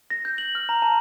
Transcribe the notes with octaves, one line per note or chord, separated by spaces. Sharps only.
A#6
G6
F#7
F6
A#5
A5